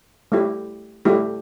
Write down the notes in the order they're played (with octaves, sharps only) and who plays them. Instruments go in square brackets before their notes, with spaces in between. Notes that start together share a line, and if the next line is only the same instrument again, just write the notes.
[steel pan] A3 E4 G4
A3 E4 G4